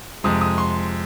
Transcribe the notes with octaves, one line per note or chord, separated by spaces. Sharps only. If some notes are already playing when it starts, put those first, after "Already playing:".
F2 C3 G#3 D#6
D#6
C6